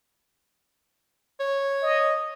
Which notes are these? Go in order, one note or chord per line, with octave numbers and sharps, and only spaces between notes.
C#5
D#5